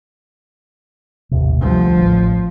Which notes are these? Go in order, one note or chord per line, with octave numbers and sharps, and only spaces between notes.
A1 D#2 C3
D2 F3 G3
A1